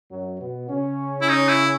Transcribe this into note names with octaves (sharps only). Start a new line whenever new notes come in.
F#2 F#3
B2 B3
C#3 C#4
E4
D#4
E4